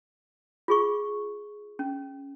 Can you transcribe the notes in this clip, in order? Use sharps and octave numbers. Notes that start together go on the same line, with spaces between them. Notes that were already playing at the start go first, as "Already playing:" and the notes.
F4 G#4 C#6
C#4